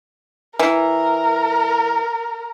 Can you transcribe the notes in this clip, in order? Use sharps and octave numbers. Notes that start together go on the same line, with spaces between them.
E3 A#4